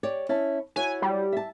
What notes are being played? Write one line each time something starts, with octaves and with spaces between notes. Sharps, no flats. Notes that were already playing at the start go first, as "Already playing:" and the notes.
G4 C#5 D5
C#4 E4 A5
E4 F#4 C#5 G#5
G3
E5 A5